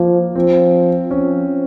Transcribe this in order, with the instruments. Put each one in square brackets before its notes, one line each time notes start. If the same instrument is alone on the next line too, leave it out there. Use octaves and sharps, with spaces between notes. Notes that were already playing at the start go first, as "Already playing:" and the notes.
Already playing: [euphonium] F3 [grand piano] A#3
[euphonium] F3 [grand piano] C4
[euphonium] F3 [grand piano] C#4